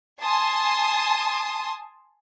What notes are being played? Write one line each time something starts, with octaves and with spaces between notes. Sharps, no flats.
G#5 A5 C6 D#6